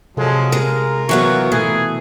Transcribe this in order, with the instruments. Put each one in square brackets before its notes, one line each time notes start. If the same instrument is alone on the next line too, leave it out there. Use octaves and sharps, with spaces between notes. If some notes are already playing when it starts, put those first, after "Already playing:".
[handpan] C3 A4 [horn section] F3 F#3 G#3
[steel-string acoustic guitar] G#3 [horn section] F4 A#4
[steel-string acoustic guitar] E3 F#3 B3 [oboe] C#6
[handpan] B2 A3 [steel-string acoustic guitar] E3 [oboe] G#4